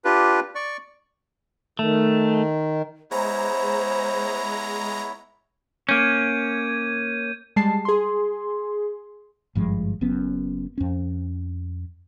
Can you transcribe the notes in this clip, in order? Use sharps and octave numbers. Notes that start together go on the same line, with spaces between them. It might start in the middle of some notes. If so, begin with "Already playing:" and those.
D4 F4 G4 B4
D5 C#6
D#3 A3
G#3 B3 E4 C5 C#5 A#5
A#3 C#4 G6 G#6 D#7
G3 G#3 A5 C7
G#4 C6
G#1 G2 F3 G#3
F#1 F#2 B3 C#4
F2 C#4